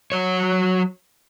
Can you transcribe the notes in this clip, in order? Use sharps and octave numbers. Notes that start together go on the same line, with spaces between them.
F#3 C#5